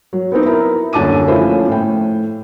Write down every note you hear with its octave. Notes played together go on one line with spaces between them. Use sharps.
F#3
B3 C4 D#4
E4 A#4 A#5
D#1 F#2 D3 A5 D6 D#7
F3 A3 C#4 E4 C5
A2 G5